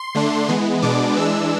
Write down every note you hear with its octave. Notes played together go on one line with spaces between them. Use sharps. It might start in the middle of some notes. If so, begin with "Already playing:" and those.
Already playing: C6
D3 A3 D4
E3 G#3 B3
B2 G#3 B3 D4 D6
E3 G#3 D4 E6